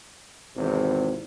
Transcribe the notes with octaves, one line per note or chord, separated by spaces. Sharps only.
G#1 E2 C3